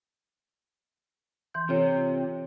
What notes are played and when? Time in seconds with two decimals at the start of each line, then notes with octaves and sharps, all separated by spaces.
1.54 E3 C6 G6
1.69 C3 F4 A4 C#5